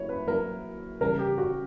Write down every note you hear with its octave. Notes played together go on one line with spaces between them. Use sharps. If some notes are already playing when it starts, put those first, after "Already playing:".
Already playing: F#3 A#3 E4 C#5
B4
F#3 A#3 E4 A#4
C#3 E3 G3 C#4 A#4
G4
F#4